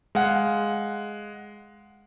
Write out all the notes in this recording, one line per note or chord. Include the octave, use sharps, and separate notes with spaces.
G#3 F5 F#5